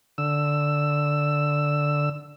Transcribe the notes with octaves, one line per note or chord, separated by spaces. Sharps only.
D3 E6